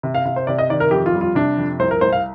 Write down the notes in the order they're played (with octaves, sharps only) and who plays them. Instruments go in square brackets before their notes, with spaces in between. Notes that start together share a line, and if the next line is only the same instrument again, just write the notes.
[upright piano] C3
F5
C3 F5
C5
C3 D5
D#5
D#3 D5
A#4
F2 G4
F4
G3
F4
C3 D4
F2
C2 C5
A#4
C2 C5
F5